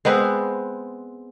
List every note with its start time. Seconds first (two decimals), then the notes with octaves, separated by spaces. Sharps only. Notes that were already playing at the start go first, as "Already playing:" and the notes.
0.05 G#3 B3 C4 B4